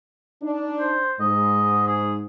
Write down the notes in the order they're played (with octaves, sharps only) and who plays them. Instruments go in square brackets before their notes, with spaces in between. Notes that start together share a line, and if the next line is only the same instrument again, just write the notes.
[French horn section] D4 D#4
[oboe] C5
[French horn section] G#2 [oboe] D#5
[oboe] G#4